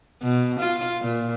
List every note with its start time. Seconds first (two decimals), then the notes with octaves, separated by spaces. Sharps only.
0.22 B2
0.60 F4
1.01 A#2